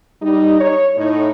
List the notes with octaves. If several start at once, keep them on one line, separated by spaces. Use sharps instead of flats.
G3 D#4
C#5
A2 D#4 C#5